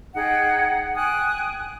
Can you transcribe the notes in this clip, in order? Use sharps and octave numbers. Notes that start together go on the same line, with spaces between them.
D#4 G#4 F#5 G5
G5 G#5 D#6 F#6